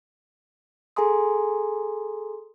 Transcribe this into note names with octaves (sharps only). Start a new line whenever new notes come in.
G#4 A4 G#5 A#5 C6 D#6